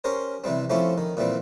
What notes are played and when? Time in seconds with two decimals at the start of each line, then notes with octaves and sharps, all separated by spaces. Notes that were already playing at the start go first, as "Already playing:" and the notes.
0.04 C#4 G4 A#4 C5
0.44 C3 E3 G3 C4
0.70 F3 A3 C4 C#4 E4 G4
0.98 D#3
1.17 A#2 E3 G3 C4